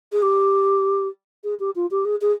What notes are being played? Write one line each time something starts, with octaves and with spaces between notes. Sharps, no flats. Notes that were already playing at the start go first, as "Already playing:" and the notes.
G#4
G4
G#4
G4
F4
G4
G#4
G#4